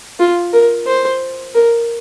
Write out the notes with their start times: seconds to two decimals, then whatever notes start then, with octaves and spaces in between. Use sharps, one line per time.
0.19 F4
0.53 A#4
0.87 C5
1.54 A#4